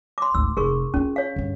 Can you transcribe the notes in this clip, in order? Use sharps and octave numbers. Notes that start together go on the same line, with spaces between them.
C6 D6
G#1 D2 E6
F1 G#4 A#4 C#6
C#4 E4 F4
C#5 F5
G2 D3